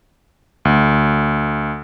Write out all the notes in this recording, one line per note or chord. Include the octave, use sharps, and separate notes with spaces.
D2